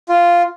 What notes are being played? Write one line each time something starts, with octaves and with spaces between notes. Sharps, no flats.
F4